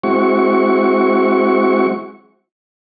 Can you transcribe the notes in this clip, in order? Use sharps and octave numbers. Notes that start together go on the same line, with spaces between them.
G#3 C4 E4 F#4 C#6